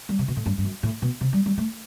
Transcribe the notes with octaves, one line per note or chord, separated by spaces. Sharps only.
G3
C3
B2
A2
G2
G2
F#2
A2
B2
C3
G3
G3
A3